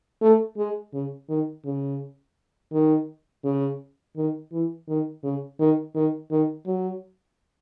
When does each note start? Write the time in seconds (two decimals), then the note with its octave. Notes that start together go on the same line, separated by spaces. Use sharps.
0.22 A3
0.58 G#3
0.93 C#3
1.29 D#3
1.65 C#3
2.72 D#3
3.45 C#3
4.16 D#3
4.52 E3
4.88 D#3
5.23 C#3
5.59 D#3
5.95 D#3
6.31 D#3
6.66 F#3